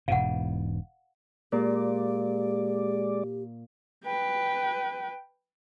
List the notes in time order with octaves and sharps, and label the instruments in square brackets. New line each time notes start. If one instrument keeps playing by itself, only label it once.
[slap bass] E1 G#2 B2 [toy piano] F5 F#5
[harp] A#2 [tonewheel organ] G#3 D5 [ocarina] G4
[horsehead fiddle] B4 G5